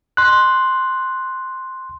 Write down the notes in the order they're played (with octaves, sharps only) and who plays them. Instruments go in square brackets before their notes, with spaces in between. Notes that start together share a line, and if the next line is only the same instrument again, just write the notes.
[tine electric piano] C6 F#6